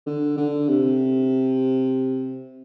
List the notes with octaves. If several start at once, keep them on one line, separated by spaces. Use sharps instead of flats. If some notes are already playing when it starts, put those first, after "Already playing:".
D3
D3
C3